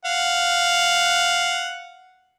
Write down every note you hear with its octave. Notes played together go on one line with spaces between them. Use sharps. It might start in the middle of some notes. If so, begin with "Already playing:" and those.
F5 F#5